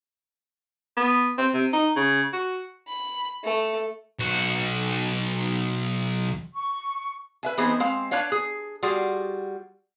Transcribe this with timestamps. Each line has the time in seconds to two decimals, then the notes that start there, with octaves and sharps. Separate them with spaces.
0.97 B3
1.38 C4
1.54 C3
1.73 D#4
1.96 C#3
2.33 F#4
2.88 B5
3.44 A3
4.19 B1 F#4
6.54 C#6
7.43 B4 E5 G#5
7.57 E3 B3 C4 D#4 G#4 C5
7.80 G#3 C4 F5
8.11 D4 B4 C#5 F5
8.32 G#4
8.83 G3 F4 F#4 G#4